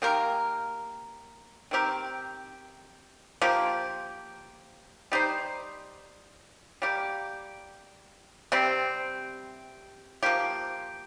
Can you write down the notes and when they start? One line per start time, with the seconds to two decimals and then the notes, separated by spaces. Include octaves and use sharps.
0.02 D#3 A#3 G4 A#4
1.71 D#3 C4 G4 A#4
3.41 F3 A#3 G4
5.12 G3 D#4 G4 C5
6.82 G3 A#3 G4
8.52 C3 G3 C4
10.23 F3 A#3 G4